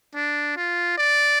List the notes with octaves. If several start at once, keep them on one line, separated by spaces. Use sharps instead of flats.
D4
F4
D5